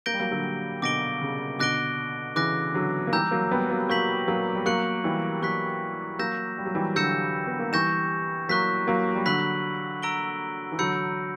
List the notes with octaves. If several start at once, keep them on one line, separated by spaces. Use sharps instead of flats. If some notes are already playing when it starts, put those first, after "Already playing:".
A#3 G6 A#6 D7 G7
G3
F#3 A#3
D3 F#3
B2 D3 D6 A#6 D7 G7
C#3
B2 D3 D6 F#6 A#6 D7 G7
C#3 E3 D6 F#6 A#6
D3 F#3
A#3
E3 G3 A#5 E6 G6
F#3 A#3
G3 B3
F#3 A#3
F#3 A#3 C#6 G6 B6 F#7
F#3 A#3
G3
F#3 A#3 C#6 F#6 C#7 F#7
E3 G3
F#3 A#3 C#6 F#6 B6
F#3 A#3 E6 G6 A#6 E7
G3
F#3
E3 G3
D3 F#3 E6 G6 A#6 C#7 E7
B3
A#3
E3 G3 C#6 G6 A#6 E7
F#3 A#3 C#6 F#6 B6
F#3 A#3
G3
D3 F#3 B5 F#6 B6 F#7
A#5 E6 A#6 D7 G7
E3
D3 F#3 B5 E6 G6 C#7